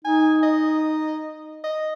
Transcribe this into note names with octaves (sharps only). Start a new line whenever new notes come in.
D#4 G#5
D#5
D#5